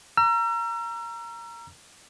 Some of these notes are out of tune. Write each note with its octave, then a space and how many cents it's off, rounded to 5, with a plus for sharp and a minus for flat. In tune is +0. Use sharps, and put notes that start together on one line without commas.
A#5 +5 E6 +45